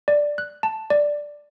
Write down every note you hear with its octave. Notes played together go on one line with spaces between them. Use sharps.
D5
F#6
A5
D5